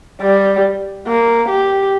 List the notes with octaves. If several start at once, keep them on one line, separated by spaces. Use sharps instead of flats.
G3
A#3
G4